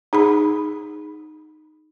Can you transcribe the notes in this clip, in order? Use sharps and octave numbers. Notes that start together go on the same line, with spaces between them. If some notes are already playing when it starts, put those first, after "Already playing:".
D#4 G#4 B5